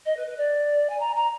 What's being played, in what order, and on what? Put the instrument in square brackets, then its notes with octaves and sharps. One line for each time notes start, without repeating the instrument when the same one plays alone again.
[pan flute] D#5
B4
B4
D5
G#5
A#5
A#5